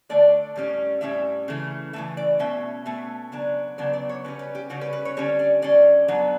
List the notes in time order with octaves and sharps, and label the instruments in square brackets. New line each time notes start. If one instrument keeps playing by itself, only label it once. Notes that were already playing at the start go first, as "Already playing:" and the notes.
[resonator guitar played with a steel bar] D3 A3 D4 D5
A2 G3 C#4
A2 G3 C#4 E5
C#3 E3 A3
C#3 E3 A3 E5
D5
B2 A3 C#4 E5
B2 A3 C#4 E5
C#3 F#3 B3 D4
C#3 F#3 B3 D4 D5
D5
C#5
C#3 G3 C#4 B4
B4
G4
C#3 G3 C#4 F#4
B4
B4
C#5
D3 G3 C#4 C#5
D5
D3 G3 C#4 D5
B2 F#3 B3 D4